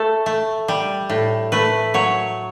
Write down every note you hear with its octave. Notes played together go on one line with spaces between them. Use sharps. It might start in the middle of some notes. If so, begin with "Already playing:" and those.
Already playing: A3 A4
A3
G3
A2
A3 B4
F#3 C#5